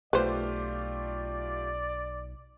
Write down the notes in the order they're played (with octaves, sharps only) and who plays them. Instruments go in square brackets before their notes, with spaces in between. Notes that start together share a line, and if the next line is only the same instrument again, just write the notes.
[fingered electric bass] B1 [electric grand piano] A3 F4 G4 [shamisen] B4 C5 [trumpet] D5